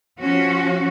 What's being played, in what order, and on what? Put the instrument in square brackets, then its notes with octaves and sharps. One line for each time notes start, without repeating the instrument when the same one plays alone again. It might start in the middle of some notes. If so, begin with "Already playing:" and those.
[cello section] F3 C#4 F#4